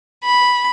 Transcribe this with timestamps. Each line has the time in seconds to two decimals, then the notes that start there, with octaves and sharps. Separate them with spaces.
0.24 B5